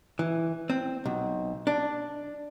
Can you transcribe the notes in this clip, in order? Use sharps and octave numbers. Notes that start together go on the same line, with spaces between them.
E3
C4
B1
D4